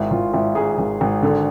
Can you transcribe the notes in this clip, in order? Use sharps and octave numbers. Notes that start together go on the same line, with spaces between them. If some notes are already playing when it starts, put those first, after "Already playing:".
Already playing: G#1 E4
G#1 F4
G#1 E4
G#2 G#4
G#1
G#1
D3 A4